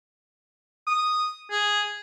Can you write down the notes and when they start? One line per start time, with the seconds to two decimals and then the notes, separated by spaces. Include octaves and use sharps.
0.87 D#6
1.51 G#4